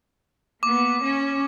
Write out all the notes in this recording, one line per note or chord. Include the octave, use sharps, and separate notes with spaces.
A#3 B3 D6
C#4